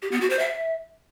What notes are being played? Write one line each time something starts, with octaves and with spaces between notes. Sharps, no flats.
G4
B3
F#4
C5
E5